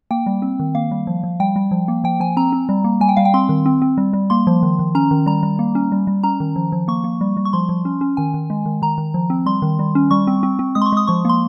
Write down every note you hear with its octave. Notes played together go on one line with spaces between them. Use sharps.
A#3 G5
G3
C4
D#3
A#3 F5
G3
F3
F3
G3 G5
G3
F3
A#3
F3 G5
F3 G#5
C4 A#5
C4
G3
A#3
G3 G#5
G5
G3 F5
G5
C4 C6
D#3
C4
C4
G3
G3
A#3 C6
F3
D#3
D#3
C#4 A#5
D#3
G3 A#5
G3
A#3
C#4
G3
G3
C#4 A#5
D#3
F3
F3
A#3 C#6
A#3
G3
G3
C#6
F3 C6
F3
C#4
C#4
D#3 G#5
D#3
G#3
D#3
D#3 A#5
D#3
F3
C4
G3 C6
D#3
G3
C#4
G3 C#6
C4
C4
C4
G#3 D#6
C6
C#6
G#3 D#6
F3 C#6
A#3 C6